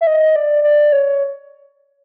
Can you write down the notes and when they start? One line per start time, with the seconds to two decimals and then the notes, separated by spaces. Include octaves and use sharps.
0.01 E5
0.07 D#5
0.36 D5
0.63 D5
0.92 C#5